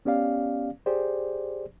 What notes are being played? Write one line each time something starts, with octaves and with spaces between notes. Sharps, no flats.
B3 C#4 G4 D5 F5
G4 G#4 C5 D5